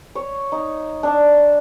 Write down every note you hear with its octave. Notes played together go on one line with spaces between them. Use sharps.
C#5
D#4
D4